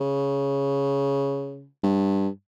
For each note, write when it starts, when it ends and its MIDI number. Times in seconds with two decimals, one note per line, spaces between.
0.01 1.67 49
1.83 2.28 43